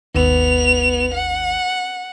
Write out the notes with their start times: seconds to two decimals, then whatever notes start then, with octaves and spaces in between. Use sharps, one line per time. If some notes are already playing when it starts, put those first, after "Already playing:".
0.15 G#1 D#2 B3 F7
1.14 F#5